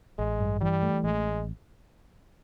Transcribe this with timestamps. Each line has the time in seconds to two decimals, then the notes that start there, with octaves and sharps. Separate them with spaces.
0.19 A1 G#3
0.40 G2
0.61 E3 G3
0.83 A3
1.04 A1 G#3